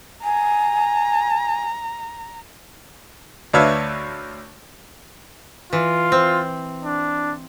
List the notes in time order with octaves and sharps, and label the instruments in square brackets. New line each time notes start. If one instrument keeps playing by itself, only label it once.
[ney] G#5 [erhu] A#5
[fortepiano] D2 D4 B4 C#5 E5 F5
[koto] E3 [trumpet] F4
[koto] C4
[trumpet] D4